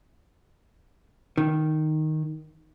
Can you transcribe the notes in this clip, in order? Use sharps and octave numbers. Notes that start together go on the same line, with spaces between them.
D#3